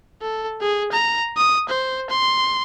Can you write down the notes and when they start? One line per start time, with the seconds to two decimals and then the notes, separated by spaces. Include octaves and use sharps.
0.22 A4
0.61 G#4
0.92 A#5
1.37 D#6
1.69 C5
2.10 C6